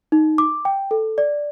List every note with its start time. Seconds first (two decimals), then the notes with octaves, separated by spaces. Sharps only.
0.12 D#4
0.38 D6
0.65 G5
0.91 A4
1.18 D5